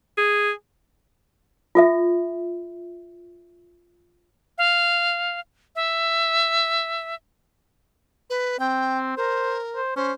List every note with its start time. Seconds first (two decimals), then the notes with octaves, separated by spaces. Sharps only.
0.18 G#4
1.75 F4 A4 E5
4.58 F5
5.75 E5
8.30 B4
8.60 C4 G5
9.17 A#4 C5
9.76 C5
9.96 C#4 C5